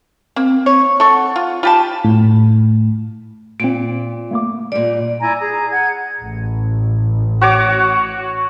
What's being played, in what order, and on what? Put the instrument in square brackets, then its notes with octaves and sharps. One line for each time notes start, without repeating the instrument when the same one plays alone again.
[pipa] A#3 [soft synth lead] C4
[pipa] C#5
[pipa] A4 C#6 [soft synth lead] F#5
[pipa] F4
[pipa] F4 G4 A5 [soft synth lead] B5
[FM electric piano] A2
[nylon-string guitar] A#2 [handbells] C4 D7
[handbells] A3 A#3 D6
[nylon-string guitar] A#2 G3 [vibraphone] D5
[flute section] E4 D5 G#5 A#5
G#4 A#5
F#5 G#6
[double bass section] A1
[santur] F#4 C#5 D6